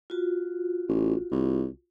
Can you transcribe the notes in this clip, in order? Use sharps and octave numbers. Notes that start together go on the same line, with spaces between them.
F4 F#4
A1
C2